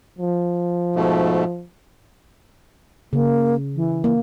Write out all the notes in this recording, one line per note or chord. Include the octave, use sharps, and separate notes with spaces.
F3
G#2 B2 A3
C#3 A#3
E3
A#3